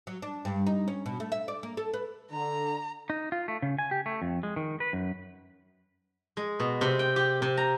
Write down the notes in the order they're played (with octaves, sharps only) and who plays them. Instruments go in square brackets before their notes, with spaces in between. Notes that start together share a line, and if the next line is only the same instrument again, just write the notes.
[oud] F#3
D4
G2
D#4
C#4
B2
A3
E5
D5
A#3
A4
B4
[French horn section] D3 [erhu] A#5
[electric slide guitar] D#4
F4
A3
C#3
G#5
G4
A3
F2
G#3
D#3
B4
F#2
[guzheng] G#3
B2
C3
G5
G4
C3
A#5